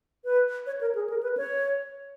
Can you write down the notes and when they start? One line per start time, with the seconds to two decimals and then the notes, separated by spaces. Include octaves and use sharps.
0.24 B4
0.66 C#5
0.81 A#4
0.95 G#4
1.10 A#4
1.23 B4
1.37 C#5